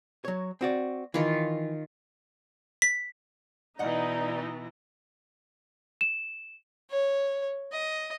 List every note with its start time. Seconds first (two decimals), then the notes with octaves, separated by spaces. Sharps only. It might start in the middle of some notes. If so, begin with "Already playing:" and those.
0.25 F#3 C#5
0.61 C4 F#4 D5
1.14 D#3 E3 F4
2.82 B6
3.79 B2 E3 D#4 D5 D#5 F#5
6.01 E7
6.90 C#5
7.72 D#5